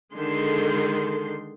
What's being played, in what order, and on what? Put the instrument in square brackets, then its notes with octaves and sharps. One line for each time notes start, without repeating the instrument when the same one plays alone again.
[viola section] D3 D#3 G#3 A4 C6